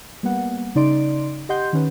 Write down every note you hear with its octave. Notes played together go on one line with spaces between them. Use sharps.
G3 A#3 B3 F#5
C#3 D#4 D5 C6 D7
G4 D#5 F#5 C6 G6
D#3 C#4 B4